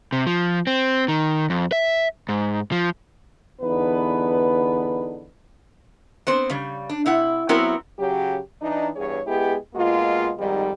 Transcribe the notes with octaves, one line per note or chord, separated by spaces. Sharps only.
C3
F3
C4
D#3
F2
E5
G#2
F3
E2 D3 B3 D#4 B4
B3 C4 C5
C#3 G3
D4
C3 E4 F#5
F#3 B3 C4 E4 F#4 A#4
C#3 F#3 G4
E3 D4 D#4
E2 G2 G#4 C#5
G#3 B3 E4 G4 G#4
B2 G#3 A#3 F4
F2 G#2 D#3 G3